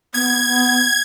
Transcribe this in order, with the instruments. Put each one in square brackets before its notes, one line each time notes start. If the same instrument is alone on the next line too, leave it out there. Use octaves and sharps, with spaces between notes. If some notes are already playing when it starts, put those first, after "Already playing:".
[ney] B3 [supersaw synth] G#6